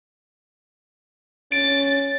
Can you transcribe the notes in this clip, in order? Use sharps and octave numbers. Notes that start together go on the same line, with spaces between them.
C#4 A6 D7